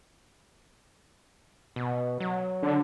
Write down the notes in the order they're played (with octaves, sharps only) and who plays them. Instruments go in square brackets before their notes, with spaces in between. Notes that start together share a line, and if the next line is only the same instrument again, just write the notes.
[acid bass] B2
F#3
[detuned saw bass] D3